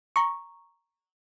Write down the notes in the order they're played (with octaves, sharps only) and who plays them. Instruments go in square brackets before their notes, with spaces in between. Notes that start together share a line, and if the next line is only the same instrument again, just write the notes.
[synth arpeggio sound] A#5 C#6